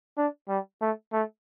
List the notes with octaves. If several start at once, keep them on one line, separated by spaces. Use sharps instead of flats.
D4
G3
A3
A3